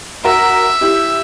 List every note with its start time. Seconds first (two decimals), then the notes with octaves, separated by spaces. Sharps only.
0.24 F#4 A#4 E5
0.81 E4 G4